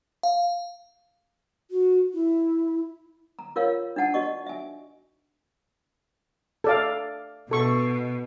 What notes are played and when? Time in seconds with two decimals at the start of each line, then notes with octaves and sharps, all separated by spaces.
0.23 F5
1.71 F#4
2.14 E4
3.39 A#5
3.56 F4 A#4 C#5 F5
3.96 D4 D#4 F#5 A5
4.14 F#4 D5 D#5 C#6
4.46 E5 G#5
6.64 A4 D5 F5
7.51 B2 A4 C#6